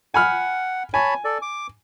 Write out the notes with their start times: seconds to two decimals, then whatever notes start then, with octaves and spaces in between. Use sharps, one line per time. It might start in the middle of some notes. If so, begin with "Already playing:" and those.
0.14 F#5 G#5 B5 F6
0.94 C#5 G#5 A5 B5
1.25 A4 D5
1.42 D6